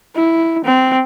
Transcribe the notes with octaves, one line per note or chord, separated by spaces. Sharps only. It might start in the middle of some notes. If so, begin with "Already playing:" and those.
E4
C4